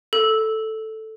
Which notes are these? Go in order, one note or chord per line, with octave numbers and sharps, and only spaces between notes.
A4